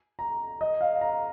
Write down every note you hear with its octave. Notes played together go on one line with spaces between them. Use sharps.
A#5
D#5
F5
A#5